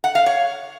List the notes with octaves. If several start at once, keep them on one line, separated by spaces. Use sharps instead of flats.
F#5
F5
C#5